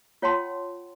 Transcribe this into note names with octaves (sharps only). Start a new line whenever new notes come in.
F4 C#5 F#5 G5 A5 C6